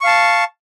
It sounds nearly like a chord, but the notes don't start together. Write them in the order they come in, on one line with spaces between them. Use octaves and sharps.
C#6 F5 A5